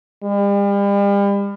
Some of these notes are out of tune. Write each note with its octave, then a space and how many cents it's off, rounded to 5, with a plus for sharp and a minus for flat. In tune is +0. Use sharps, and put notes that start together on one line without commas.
G3 +40